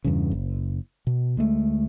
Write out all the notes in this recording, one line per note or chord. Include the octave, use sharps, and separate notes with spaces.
E2 G2 C#3
F#1
B2
D2 G#3 A3